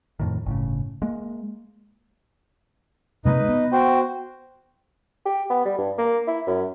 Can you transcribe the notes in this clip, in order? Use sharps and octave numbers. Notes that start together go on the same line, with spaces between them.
F2 A2 D#3
G1 A2 C#3
G#3 A#3
C3 G#3 A#3 D#4 B4 D#5
B3
F#4 C5 G5
G4
B3
G3
G2
A#3
E4
F#2